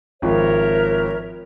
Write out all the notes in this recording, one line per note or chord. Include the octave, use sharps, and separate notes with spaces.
G#1 F3 A#4 C#5 E5